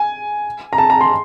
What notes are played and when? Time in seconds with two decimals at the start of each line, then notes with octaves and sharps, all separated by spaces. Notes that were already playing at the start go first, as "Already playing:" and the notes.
Already playing: G#5
0.73 A#5
0.78 A5
0.90 A#5
1.01 C6